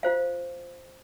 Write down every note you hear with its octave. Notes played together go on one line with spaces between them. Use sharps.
F4 C5 F5